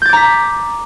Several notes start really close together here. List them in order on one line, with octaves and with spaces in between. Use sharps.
G6 A6 D6 A#5 B6